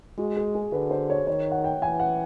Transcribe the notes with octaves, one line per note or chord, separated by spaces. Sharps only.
G#3 F#4
G#4
G#4
D3 B4
C5
C#5
D#3 C#5
F#5
G5
E3 G#5
F#5